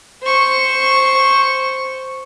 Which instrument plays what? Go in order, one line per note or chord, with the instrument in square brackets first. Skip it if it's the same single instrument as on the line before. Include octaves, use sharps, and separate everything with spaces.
[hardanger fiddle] C5 C#6